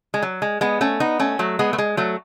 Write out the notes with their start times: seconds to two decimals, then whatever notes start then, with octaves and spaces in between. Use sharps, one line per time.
0.14 G#3
0.22 F#3
0.42 G#3
0.61 G#3 B3
0.81 A3 C#4
1.00 B3 D#4
1.19 A3 C#4
1.39 F#3 A3
1.59 G#3 B3
1.73 A3
1.78 G#3
1.97 F#3 A3